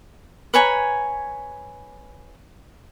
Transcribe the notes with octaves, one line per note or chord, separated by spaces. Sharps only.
B4 C#5 G#5 A#5